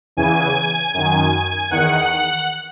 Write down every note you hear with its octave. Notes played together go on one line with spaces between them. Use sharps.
E2 C#3 E3 G#5
F#2 D#3 G#5
E2 D#3 F#5